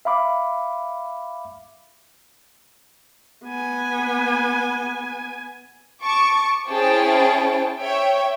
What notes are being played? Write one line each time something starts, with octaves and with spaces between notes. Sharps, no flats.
E5 F5 B5 D6
B3 G#5
A5 C#6 D6
C#4 E4 G#4 C5 G5 A5
C#5 E5 G5